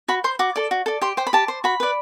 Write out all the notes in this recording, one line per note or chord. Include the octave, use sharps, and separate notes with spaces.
F#4 B5
C5 C6
F#4 D6
A4 D5
F#4
A4 D5
G4 C6
C5 G5
B5
G4 A5
C5
F#4 B5
B4 D5